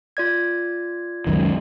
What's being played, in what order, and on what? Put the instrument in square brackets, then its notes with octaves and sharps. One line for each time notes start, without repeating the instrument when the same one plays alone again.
[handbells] F4 D5 G#6
[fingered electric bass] C#2 F#2 D#3